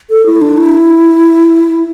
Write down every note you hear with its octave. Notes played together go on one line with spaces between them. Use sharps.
A4
E4
D4
E4